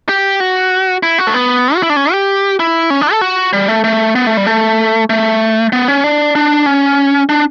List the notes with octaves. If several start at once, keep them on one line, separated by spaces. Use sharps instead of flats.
G4
F#4
E4
F#4
A3
B3
F#4
E4
D4
C#4
G4
E4
C#4
D4
A4
F#4
G3
A3
A3
B3
A3
G3
A3
A3
B3
C#4
D4
D4
C#4
D4